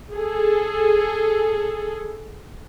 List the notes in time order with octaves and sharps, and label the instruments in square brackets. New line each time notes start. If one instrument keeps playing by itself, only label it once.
[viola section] G#4 A4